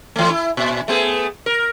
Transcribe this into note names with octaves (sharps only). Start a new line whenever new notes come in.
E3 A3
E4
A#2
A3 B3 G#4
A#4